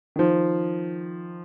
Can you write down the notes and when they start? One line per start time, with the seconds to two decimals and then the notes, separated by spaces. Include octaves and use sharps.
0.16 D#3 F3